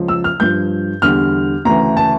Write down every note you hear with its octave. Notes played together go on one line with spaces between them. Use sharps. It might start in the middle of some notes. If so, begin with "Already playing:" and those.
Already playing: C#2 C#3 F3
E6
F6
G2 F3 G6
E2 D3 G3 F6
D2 C#3 E3 A#5
A5